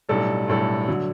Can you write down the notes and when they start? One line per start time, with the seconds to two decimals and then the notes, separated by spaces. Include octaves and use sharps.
0.09 B1 A2 G3 D4 A4
0.48 B1 A2 G3 D4 A4
0.88 D3 F#3